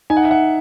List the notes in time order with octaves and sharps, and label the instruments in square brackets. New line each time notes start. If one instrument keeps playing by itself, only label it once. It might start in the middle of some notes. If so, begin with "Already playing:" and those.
[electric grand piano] D#4 [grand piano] G#5
[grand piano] F#5
E5
F#5